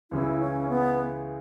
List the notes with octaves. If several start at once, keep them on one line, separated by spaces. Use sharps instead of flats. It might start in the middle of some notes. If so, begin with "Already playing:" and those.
C#2 C#3 E3 E4
C#4
B3